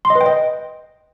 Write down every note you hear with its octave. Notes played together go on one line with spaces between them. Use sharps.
C6
D#5
B4
G5
D#5